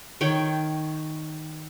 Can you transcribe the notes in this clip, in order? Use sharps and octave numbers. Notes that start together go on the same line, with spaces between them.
D#3 C#5 G5